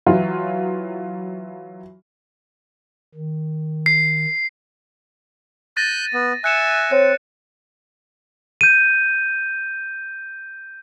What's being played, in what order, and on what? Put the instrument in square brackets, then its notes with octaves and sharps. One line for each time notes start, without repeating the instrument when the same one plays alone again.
[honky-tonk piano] E3 F#3 F4
[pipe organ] D#3
[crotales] C7
[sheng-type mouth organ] F#6 G6 [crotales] A6 A#6 D#7
[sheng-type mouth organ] B3
[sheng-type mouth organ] E5 G#5 [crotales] F#6 C#7 E7
[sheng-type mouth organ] C4 [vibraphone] C#5
[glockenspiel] G6 D#7